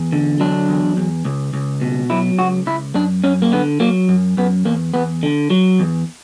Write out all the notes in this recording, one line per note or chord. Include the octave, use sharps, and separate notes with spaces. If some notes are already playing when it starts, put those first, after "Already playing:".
Already playing: E2
D3
F#3 D4
E2
E2
C#2
C#2
B2
F#3 E4
C#2 F#4
C#2 E4
F#2 D4
F#2 C#4
A#3
D3 B3
F#3 A#3
F#2
F#2 B3
E2 A#3
E2 B3
D3
F#3
E2